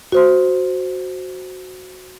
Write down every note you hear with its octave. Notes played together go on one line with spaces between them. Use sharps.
F#4 C5 C6